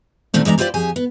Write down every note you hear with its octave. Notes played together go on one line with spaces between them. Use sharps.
A#2 D#3 A3 C4 D4
E2 G#3 D4 F5 A#5
E4 F4 G4 G#4 C5 D5
F2 G4 G#4 G#5
B3